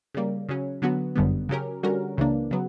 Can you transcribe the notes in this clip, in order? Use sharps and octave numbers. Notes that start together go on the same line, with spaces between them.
C#3 G3 A#3
C#3 F#3 C#4
D3 F#3 B3 F#4
G1 F#2 D3 G3 B3
C#3 F#3 C#4 G4 A#4
D3 G3 C#4 F#4 A#4
C#2 C#3 E3 A#3 D4
C#3 F#3 B3